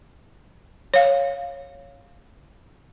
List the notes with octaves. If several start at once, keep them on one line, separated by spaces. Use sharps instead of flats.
C#5 F5